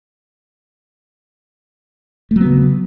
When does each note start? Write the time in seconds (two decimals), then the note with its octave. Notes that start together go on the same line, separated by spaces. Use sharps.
2.31 A3
2.36 F#3
2.41 B3
2.46 C#3